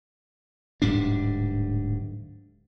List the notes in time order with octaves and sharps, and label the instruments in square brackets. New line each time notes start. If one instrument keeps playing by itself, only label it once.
[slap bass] D1 G#2 G3 D4